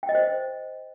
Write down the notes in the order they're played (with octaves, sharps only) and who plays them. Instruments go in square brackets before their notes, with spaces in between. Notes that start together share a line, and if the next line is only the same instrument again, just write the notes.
[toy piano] G5
D#5
C5